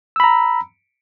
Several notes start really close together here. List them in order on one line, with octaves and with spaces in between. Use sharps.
E6 B5 A#5